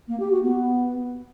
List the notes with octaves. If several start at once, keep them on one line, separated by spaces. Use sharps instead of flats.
A#3
G4
F#4
B3